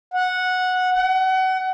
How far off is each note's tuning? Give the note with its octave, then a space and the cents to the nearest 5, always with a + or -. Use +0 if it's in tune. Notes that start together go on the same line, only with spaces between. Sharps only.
F#5 -10
F#5 +30